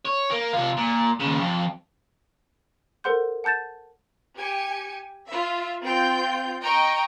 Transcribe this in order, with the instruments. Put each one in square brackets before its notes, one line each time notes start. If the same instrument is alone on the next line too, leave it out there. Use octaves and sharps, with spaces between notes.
[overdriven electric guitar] C#5
A#3
C3 F4
A#2
D#2 C#3
F2
[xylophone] A4 A#4 C5 F#5 C6 G6
F#5 A5 G6 A6 E7
[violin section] G4 G#5 C#7
F4 E5
C4 F4 G5 G6
D#5 G5 A#5 C#6